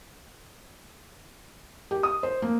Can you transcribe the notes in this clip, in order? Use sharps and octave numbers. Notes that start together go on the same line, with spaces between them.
G4
D#6
C5
A#3